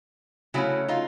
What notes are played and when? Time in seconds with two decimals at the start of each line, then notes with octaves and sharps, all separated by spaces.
0.54 C#3 F#3 A3 C#4 E4 F#4
0.88 D#4 F4